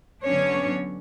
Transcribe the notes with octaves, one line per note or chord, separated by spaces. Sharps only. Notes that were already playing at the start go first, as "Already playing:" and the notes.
D3 F#3 B3 C#4 D4 C#5